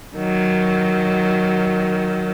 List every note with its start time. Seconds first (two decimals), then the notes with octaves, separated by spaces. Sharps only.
0.15 D#3 F#3